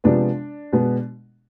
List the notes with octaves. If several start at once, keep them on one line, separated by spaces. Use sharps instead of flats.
C3 F3 G#3 B3 D4
B2 G#3 B3